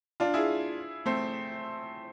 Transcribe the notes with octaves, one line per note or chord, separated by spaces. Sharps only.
D4 F4
E4 G#4
A3 C4